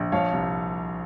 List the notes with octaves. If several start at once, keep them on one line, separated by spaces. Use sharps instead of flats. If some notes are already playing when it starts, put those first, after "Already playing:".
Already playing: A#1
F3 C#5 F5
C2